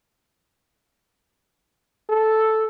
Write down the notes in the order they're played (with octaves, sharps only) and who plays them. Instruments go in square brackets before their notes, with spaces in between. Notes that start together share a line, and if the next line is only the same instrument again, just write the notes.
[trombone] A4